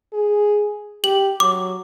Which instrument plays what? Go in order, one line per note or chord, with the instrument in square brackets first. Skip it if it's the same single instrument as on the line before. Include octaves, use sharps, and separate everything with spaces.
[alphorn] G#4
[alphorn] G4 [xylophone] F#7
[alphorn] F#3 [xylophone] D6